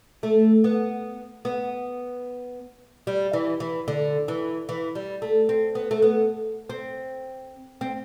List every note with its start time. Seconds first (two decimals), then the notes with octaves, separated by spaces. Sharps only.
0.23 A3
0.64 B3
1.45 B3
3.07 G3
3.33 E3
3.60 E3
3.88 D3
4.28 E3
4.69 E3
4.95 G3
5.22 A3
5.49 C4
5.75 B3
5.91 A3
6.02 B3
6.69 C4
7.81 C4